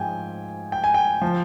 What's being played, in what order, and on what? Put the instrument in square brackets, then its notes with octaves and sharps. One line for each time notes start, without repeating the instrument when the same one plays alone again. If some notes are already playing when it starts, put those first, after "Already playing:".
Already playing: [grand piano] G#2 F3 G5 G#5
G5
G#5
G5
F3